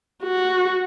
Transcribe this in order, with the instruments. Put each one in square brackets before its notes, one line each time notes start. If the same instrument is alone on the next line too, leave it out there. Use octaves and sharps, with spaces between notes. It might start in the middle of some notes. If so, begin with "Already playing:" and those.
[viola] F#4